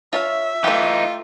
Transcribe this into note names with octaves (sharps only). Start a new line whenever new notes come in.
F4 C#5 E5 F5
E3 A3 D#4 F4 G4